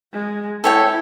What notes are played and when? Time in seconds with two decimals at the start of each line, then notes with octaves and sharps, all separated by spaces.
0.13 G#3
0.64 E4 A4 C#5 G5